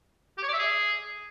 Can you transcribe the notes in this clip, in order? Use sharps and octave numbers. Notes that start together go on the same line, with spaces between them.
G4
C#5
D5
E5
G#4